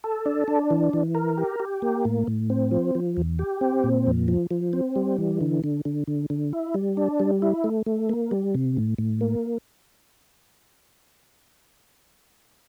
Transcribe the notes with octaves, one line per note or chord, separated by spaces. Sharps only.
A4
D4
D4
E3
E3
A#4
G4
G4
A#3
A2
A2
C4
F3
F3
E2
G4
C4
A#2
F2
F3
F3
C4
G3
E3
D3
D3
D3
D3
D3
E4
G3
D4
G3
E4
A3
A3
A#3
G3
C3
A2
A2
A#3